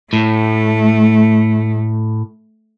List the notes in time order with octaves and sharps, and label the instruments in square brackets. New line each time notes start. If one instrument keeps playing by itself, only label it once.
[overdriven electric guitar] A2 [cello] A3